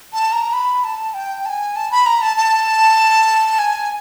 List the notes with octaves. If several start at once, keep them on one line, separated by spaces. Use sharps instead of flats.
A5
A#5
B5
A5
G5
A5
G#5
A5
B5
A#5
A5
A5
G#5